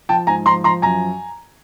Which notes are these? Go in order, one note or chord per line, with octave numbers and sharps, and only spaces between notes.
F3 G5 A5
G#2 G#5 A#5
F3 A#5 C6
F3 A#5 C6
F#2 G#5 A#5